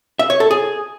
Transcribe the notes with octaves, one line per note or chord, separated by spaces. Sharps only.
E5
C#5
A4
G#4